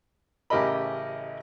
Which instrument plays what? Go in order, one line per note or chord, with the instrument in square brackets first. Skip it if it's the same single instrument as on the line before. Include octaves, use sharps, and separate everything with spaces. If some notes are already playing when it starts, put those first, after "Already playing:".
[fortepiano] A1 C#3 G4 A#4 D#5 B5